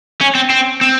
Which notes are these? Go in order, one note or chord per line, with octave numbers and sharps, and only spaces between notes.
C#4
C4
C4
C4